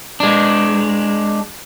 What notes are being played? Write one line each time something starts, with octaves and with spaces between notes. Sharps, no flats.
G#3 D4